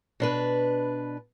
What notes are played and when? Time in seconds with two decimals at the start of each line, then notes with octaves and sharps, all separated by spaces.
0.20 B2 D4 B4